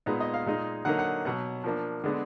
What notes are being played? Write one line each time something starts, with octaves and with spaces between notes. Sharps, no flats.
A#2 G#3 B3 D#4
D#5
F5
A#2 G#3 D#4
D3 F#3 A#3 D#4 F#5
F#5
B2 F#3 B3 F#5
F3 A#3 D4
D3 G#3 B3 D4